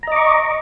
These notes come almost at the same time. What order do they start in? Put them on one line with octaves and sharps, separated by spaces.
A#5 D#5 D6 C#6